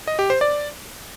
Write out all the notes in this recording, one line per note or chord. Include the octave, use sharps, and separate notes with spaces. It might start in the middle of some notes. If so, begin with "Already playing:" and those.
D#5
G4
C5
D5